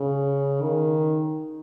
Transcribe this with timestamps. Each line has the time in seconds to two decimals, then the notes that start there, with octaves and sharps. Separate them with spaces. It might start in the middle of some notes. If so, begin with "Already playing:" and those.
Already playing: C#3
0.62 D#3